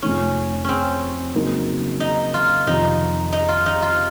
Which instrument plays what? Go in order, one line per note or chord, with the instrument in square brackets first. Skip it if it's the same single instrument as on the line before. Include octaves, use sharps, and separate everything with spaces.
[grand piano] F2 C3 F3 A3 D#4 [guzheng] C#4
[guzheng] C4 C#4
[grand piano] C#3 F#3 A#3 D#4 A#4
[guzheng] D#4
F4
[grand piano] F2 C3 D#3 [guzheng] D#4
[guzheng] D#4
F4
D#4
F4